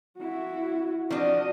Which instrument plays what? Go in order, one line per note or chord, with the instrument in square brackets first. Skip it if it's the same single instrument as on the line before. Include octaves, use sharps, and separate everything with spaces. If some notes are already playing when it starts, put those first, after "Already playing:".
[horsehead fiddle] E4 F#4
[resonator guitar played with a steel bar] F3 D4 [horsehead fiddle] F#4 D#5